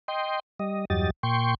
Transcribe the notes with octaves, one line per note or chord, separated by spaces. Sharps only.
D#5 G5 C6
G3 D#5
E2 G2 F#3 G4 D#5 A6
A#2 G5 C6 C#6